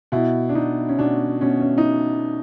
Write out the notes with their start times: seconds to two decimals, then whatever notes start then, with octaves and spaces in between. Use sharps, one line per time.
0.12 B2 E4
0.49 D4
0.55 B2 D#4
0.89 C#4
0.98 B2 D4
1.41 B2 C#4
1.61 C#4
1.78 D#4